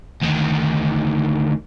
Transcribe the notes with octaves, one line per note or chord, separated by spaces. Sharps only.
D2 D#3